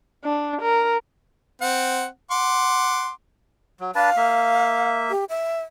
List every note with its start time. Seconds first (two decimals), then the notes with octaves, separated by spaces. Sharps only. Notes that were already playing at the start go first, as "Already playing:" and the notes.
0.24 D4
0.61 A#4
1.62 C4 F#5
2.31 F#5 C6 D6
3.80 F#3
3.95 D4 B4 F5 A5
4.17 A#3 E5
5.10 G4
5.29 E5